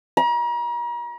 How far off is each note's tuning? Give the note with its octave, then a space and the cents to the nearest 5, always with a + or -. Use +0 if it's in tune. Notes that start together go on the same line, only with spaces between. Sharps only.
A#5 +40